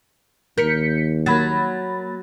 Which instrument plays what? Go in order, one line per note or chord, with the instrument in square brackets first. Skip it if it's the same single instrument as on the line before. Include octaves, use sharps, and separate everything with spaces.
[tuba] D#2 [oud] A#4 [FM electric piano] G6 B6 C#7
[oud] F#3 [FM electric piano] A#3 B5 A6